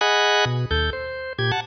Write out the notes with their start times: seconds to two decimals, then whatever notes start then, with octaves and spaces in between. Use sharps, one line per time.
0.01 G#4 D#5 F#5 G#5 B5 F#6
0.46 B2
0.71 D#2 A4 G6
0.93 C5
1.39 A#2 G4 G#6
1.52 F#5 A5